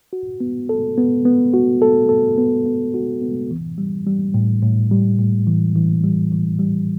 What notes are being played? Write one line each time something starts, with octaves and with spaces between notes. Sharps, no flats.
F#4
B3
A4
B3
B3
F#4
A4
A4
B3
B3
F#4
B3
E3
G3
G3
A2
A2
G3
A2
E3
E3
G3
E3
G3